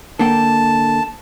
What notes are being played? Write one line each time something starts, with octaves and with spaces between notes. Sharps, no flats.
D3 A#3 G5 A5